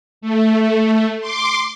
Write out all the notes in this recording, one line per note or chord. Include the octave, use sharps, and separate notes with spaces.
A3
C6 D6